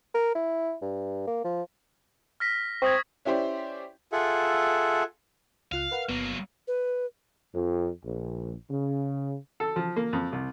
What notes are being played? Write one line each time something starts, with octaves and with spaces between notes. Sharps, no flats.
A#4
E4
G2
A#3
F3
F6 A#6 B6
C4 C#6 D#6 G#6
C#4 E4 G4 C5 D5
F4 G#4 A4 E5 F#5
C#2 F4 F5 F#6
A#4 B4 F#5
G1 F#3 A#3 B3
B4
F2
A#1
C#3
A4
F3
A#3
F2
C2